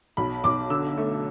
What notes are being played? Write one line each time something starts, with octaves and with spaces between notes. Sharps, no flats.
B1 B5
B1 D6
D3 E6
A3